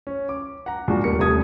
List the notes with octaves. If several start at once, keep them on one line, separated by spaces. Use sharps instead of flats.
C#4
D6
F#5 A#5
A#2 G#3 D4 F#4
D#1 G3 A#4 C#7
D#1 C2 G3 A3 D#6 G#6